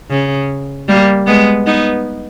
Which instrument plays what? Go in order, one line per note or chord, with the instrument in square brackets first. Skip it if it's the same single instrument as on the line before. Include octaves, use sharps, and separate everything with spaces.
[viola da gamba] C#3
G3 A#3
G#3 B3
B3 D#4